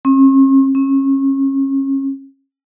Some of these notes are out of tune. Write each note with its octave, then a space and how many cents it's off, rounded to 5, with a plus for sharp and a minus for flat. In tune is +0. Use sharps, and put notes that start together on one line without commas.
C#4 -45
C#4 -30